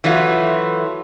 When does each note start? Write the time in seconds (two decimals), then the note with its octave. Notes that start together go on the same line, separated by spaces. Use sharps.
0.04 E3 F#3 A3 F4